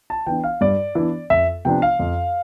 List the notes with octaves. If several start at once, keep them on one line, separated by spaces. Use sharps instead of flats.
A5
E3 B3 D4 G5
F5
G2 D5
E3 B3 D4
F2 E5
C3 F3 B3 D4 G5
F5
F2